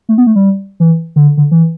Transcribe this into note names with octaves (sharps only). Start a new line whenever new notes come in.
A3
B3
A3
G3
E3
D3
D3
E3